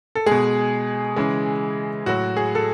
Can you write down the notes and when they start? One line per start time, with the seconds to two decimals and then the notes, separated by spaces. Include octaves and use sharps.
0.15 A4
0.26 B2 G#3 G#4
1.16 C#3 E3 G#3
2.06 A2 F#3 F#4
2.37 G#4
2.55 A4